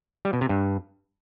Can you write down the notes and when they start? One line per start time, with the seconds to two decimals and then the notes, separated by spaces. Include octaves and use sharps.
0.25 G3
0.33 B2
0.41 C3
0.49 G2